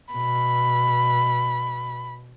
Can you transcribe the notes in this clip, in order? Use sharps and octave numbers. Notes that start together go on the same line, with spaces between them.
B2 B5